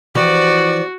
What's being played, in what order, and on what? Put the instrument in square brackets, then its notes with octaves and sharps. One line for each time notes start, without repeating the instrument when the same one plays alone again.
[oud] E3 F3 G4 [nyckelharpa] F#4 [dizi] D5